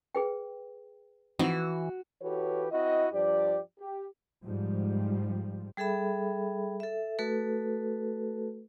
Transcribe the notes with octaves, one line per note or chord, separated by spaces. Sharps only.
G#4 B4 G5
E3 F3 C4 D#4 F#4 F#5 B5
E3 F#4 G4 A4 B4 C#5
C4 E4 F#4 D#5
G2 F3 G4 D5
G4
G#2 F3 G3
G3 G#4 A4 E5 B5
A4 E5
A3 F#4 A4 B4